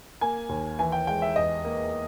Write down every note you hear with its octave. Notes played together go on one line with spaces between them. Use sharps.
A#3 G#5
D#2
E3 G#5
G5
G#3 G5
E5
E2 D#5
A#3